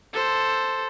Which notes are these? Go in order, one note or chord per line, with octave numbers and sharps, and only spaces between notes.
A4 C5